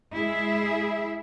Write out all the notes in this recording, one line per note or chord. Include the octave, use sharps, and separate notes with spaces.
G#3 E4 G#4 E5